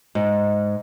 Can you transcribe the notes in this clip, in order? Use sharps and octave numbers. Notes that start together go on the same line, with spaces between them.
G#2